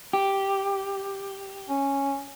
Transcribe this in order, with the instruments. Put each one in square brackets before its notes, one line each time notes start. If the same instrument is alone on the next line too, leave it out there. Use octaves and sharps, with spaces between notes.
[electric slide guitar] G4
[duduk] C#4